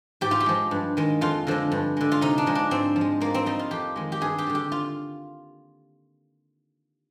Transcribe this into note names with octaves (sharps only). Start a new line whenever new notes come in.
G#2 G4
F4
G4
F3 G#3
G2
D#3 G#3
F2 F4
D3 F3 G#3
G2
D3 G#3
F4
C3 D#4
D4
F3 G#3
D4
G#2 C4
F3
G#3
G#2 A#3
C4
G3 D#4
F4
F2 G4
D#3 G#3
G4
G2 G#4
G4
D3 G3
G4
F4